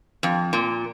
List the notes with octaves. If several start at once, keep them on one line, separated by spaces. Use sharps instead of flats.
F2
A#2